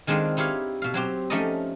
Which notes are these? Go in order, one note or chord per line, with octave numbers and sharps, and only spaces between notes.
D#3 G#3 C4 D4 D#4 F4
D#4 E4 G4 C#5 F5
B2 F5
F#3 C4 G4
F3 A3 C#4 D#4 D5 D#5